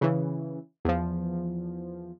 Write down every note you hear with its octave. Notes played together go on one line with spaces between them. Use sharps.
C#3 E3
E2 F3